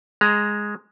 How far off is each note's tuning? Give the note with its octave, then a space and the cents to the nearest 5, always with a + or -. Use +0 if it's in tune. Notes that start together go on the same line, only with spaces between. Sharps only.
G#3 +0 A#5 +0